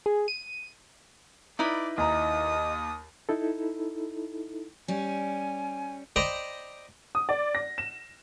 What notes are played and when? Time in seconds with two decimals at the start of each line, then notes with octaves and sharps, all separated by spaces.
0.06 G#4
0.28 D#7
1.59 D#4 E4 B4 D5
1.98 D#2 D#5 A#5 D#6
3.29 D#4 E4 A4
4.88 G3 C#4 G#5
6.16 C5 D5 D#5 G5 A#5 B5
7.15 D#6
7.29 D5
7.55 A#6
7.78 E7